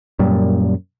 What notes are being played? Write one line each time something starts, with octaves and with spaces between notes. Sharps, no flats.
F#2 A#2 G3